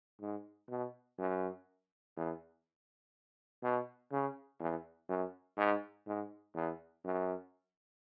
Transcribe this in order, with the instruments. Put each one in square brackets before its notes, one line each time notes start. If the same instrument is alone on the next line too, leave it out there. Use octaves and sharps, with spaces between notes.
[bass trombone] G#2
B2
F#2
E2
B2
C#3
E2
F#2
G#2
G#2
E2
F#2